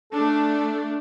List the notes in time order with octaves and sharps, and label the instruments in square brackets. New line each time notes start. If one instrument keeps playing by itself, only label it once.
[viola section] A3 D4 [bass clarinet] A4